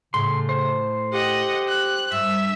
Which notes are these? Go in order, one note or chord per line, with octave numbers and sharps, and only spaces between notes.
A2 C#3 C6
C5
G4 D#5 F#5
F#6
G2 E5